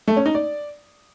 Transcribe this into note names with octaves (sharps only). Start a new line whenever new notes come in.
A3
C#4
D#4
D5